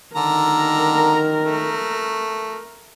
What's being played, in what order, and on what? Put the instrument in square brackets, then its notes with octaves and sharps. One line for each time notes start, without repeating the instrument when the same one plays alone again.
[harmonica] D3 A#5 [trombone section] D#3 [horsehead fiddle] A#4
[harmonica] A3